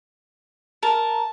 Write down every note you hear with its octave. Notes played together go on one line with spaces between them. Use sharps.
A#4 A5